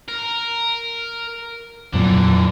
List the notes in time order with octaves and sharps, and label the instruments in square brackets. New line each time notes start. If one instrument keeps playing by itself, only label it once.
[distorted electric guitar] A#4
[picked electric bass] F2 A#2 F#3 [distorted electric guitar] D3 E3